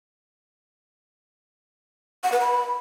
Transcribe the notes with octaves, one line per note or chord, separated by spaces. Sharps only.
F#5
B4
B5